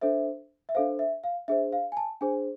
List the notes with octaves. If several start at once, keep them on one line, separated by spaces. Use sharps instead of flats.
D4 A4 C5 E5
E5
D4 A4 C5 F5
E5
F5
D4 G#4 C5 E5
F5
G#5
A5
D4 G#4 C5 G#5